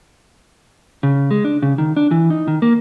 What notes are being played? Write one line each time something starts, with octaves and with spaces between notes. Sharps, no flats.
C#3
G#3
D4
C#3
D#3
D4
E3
D#4
D#3
A#3